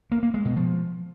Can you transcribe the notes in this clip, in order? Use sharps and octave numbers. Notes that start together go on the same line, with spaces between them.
A#3
A#3
G#3
B2
F3